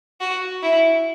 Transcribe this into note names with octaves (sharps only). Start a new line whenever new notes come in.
F#4
E4